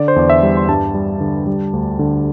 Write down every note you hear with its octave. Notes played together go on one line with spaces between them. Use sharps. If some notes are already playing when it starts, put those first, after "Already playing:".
Already playing: D3 D5
C5
E2 D5
E5
G3
C6
G2 A5
G3
D3
G3
D2
D3